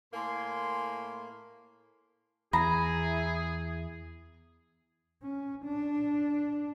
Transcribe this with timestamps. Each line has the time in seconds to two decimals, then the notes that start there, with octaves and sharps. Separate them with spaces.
0.13 A2 A#3 A#4 G#5 C6
2.53 E2 E4 G#4 A#5 B5
5.22 C#4
5.65 D4